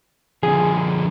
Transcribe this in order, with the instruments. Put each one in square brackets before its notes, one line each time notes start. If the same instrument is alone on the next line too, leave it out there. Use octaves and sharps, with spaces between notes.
[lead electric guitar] D3 F3 [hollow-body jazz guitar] G#4